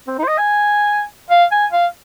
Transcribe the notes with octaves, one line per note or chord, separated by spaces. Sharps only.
C4
D#4
C5
D#5
G#5
F5
G#5
F5